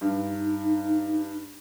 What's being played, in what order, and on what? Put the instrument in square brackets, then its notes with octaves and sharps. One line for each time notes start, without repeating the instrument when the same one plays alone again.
[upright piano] G2 [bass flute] D#4